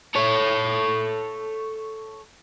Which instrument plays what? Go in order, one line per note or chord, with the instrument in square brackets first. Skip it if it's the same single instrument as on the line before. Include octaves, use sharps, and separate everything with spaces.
[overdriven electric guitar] A4 C#5